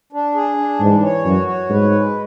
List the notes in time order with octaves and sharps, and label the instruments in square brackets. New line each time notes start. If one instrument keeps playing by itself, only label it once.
[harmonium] D4
G#4
D4
[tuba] G#2 [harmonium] E3
[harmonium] C#5
[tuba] F#2 [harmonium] F#4
[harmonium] C#5
[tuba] G#2 [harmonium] B4
[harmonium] G#3